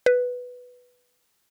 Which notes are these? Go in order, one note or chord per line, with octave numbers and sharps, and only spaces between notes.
B4